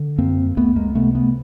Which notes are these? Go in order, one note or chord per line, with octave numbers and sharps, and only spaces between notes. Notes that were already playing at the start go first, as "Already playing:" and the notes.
Already playing: D3
F#2 A#3 C4
C#2 A3 B3
G#3 A#3
C3 A3 B3
A3 B3